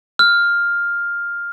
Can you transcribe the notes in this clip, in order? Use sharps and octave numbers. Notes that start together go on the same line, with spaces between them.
F6